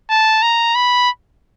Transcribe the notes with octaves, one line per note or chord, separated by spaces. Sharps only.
A5
A#5
B5